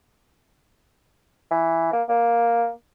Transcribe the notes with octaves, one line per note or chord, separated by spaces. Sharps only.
E3
A#3
A#3